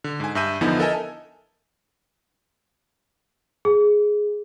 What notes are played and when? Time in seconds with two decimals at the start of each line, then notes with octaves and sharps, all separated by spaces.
0.04 D3
0.20 G#2 G#5
0.35 G2 E5 E6 G6 D#7
0.61 E2 D3 F3 B3 D#4 E4
0.79 A4 A#4 D#5 E5 G#5 A5
3.65 G#4